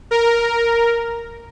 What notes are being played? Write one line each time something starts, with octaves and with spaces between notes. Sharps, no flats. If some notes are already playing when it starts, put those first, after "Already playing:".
A#4